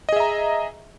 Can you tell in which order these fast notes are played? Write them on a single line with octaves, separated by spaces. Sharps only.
D#5 G#4 E5 A#5